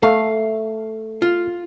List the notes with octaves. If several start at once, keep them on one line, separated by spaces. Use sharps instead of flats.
A3 F5
F4